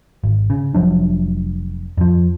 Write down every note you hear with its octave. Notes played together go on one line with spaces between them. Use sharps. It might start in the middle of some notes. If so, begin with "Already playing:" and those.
G#1
C#3
F1 F3 F#3 D4
F2 F3